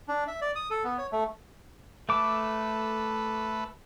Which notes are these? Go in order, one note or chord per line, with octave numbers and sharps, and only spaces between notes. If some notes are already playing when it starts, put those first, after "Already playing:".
D4
E5
D5
D#6
A4
B3
C#5
A3
A3 A4 B4 D6